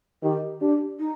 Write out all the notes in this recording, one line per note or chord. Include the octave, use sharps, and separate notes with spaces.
D#3 G4
D4 G4
D#4